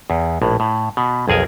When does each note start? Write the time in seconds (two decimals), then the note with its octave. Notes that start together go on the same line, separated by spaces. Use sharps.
0.10 E2
0.42 A#1 A2
0.60 A2
0.97 B2
1.28 B1 F2 G#4 A#4 G#5